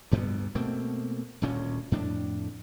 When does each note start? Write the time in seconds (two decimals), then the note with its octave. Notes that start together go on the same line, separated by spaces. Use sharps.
0.11 D2 G2 G3 B3
0.55 B2 A3 A#3 C4
1.42 D#1 D2 A#2 C#4
1.92 F2 A2 D4